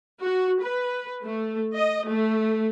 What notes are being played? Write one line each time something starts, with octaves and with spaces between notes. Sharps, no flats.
F#4
B4
A3
D#5
A3